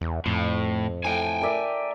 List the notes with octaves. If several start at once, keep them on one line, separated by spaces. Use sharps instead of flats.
E2
F2 A2
A2 G5 G#5
A#4 D5 E5